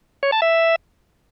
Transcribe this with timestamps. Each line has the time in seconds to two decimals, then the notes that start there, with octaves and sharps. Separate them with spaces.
0.23 C#5
0.32 A5
0.42 E5